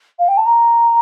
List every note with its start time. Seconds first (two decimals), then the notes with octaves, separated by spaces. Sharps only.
0.19 F5
0.28 G5
0.37 A5
0.46 A#5